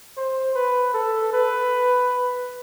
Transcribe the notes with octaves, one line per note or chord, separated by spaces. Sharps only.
C5
B4
A4
B4